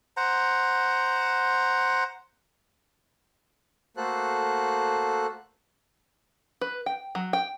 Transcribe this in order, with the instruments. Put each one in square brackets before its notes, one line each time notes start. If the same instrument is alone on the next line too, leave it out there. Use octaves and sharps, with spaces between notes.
[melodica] C5 F#5 A#5
[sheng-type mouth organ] A3 A#3 F#4 A4 C5 F#6
[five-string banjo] B4
G5
F#3
G5